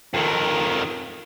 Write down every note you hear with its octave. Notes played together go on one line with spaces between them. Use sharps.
F2 D#3